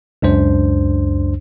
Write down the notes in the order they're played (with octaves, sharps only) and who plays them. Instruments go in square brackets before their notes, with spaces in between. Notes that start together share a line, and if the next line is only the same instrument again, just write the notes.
[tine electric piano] C#2 F#2 D4 C5